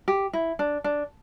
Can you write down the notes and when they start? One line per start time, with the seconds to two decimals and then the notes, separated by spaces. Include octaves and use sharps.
0.08 G4
0.33 E4
0.59 D4
0.84 D4